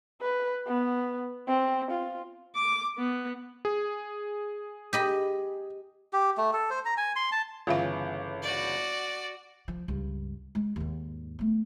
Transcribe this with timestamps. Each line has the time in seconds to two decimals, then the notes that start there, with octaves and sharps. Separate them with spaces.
0.21 B4
0.67 B3
1.48 C4
1.91 F4
2.56 D6
2.98 B3
3.65 G#4
4.93 G4 D#5 B5
6.13 G4
6.37 A3
6.53 A4
6.70 C5
6.86 A#5
6.97 G#5
7.16 C6
7.32 A5
7.67 G1 C#3 E3 F4 E5 F5
8.42 F#4 D5
9.68 F3
9.88 C#2 G2
10.55 G#3
10.76 D#2 G#2
11.39 A3 B3